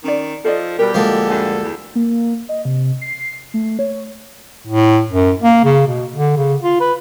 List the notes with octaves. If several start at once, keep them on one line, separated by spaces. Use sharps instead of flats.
D#3 C#4 D5
F3 A4 D5 D#5
B2 G3 G4 A#4
D2 D3 F3 G#3 A#3 G#4 A4
G2 G#5
E2
A#3
D#5
C3
C7
A3
C#5
A2
F#2
A#3
C#3
B2
D3
C#3
F4
B4